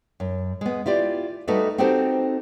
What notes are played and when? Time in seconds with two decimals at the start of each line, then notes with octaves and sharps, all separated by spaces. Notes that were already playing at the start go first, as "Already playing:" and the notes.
0.20 F#2
0.61 G#3 B3
0.86 E4 F4 G4 D5
1.48 G3 A3 D#4 F#4 A4 B4
1.78 C4 D#4 F#4 G4 A4 C5